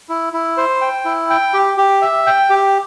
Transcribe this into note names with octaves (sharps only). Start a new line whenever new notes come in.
E4
E4
C5
G5
E4
G5
G4
G4
E5
G5
G4